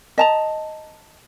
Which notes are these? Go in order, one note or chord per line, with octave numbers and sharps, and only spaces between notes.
D#5 A5 A#5